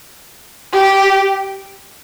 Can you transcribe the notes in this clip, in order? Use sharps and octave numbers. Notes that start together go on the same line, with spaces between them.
G4